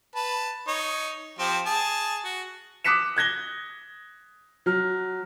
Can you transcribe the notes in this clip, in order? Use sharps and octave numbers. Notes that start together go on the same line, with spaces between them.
B4 A5
D#4 C#5
F3 C4 G4
G#4 A5
F#4
D6 D#6 F#6 B6 C#7 E7
F#6 G#6 A#6 G7
F#3 F6